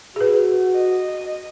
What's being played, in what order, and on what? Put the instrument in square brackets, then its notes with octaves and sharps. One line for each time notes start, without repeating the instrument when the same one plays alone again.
[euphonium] F#4 [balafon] G#4 B4
[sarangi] D#5